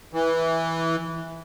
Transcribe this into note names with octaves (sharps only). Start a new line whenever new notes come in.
E3